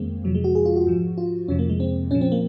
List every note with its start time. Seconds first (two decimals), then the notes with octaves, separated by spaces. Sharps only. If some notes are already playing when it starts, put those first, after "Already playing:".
Already playing: F2 D#3 G#3 A#3 C4
0.24 F2 C3 F3 F#3
0.35 G#3
0.44 F#4
0.55 G#4
0.65 F4
0.76 F#4
0.87 G#2 F3
1.18 F4
1.48 F2 C3 F3 C#4
1.59 A#3
1.69 G#3
1.80 C4
2.11 A#2 F3 C#4
2.21 C4
2.32 A#3